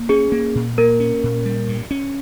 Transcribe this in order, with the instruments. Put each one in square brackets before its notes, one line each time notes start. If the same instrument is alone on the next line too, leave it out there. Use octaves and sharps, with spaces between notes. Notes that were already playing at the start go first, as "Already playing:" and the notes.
Already playing: [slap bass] A#3
[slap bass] C#4 [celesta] G#4
[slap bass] A#3
A#2
[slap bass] A#3 [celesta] A#4
[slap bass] C#4
A#2
G3
G2
C#4